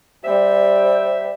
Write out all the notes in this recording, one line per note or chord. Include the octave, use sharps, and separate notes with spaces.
G3 C5 E5